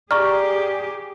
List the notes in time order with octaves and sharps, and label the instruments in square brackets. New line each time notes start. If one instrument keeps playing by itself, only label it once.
[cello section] G4 G#4 [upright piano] D5 A#5 [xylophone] C#6 F6